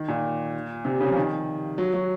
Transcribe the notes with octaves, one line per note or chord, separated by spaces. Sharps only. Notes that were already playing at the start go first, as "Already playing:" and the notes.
Already playing: D#3
A#2
C3
C#3
F3
D#3
F#3
F#3